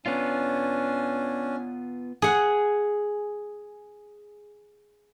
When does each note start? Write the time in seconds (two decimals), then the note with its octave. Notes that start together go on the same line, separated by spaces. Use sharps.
0.06 B3 C#4 D4 F4
2.22 G#4 F#5